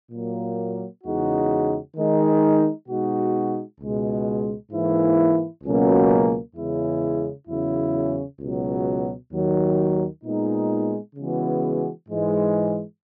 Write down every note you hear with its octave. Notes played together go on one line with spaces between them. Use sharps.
A#2 F#3 A#3
E2 C#3 G#3 D#4 F#4
D#3 G#3 D#4
B2 G#3 D#4 F#4
C#2 B2 G#3
G#2 E3 A#3 E4
C#2 B2 F#3 A#3 C#4
E2 C#3 G#3 C#4 E4
E2 C#3 F#3 C#4 E4
C#2 B2 F#3
D#2 D#3 F#3
A#2 G#3 B3 D#4
C#3 E3 G#3 B3 F#4
G#2 E3 G#3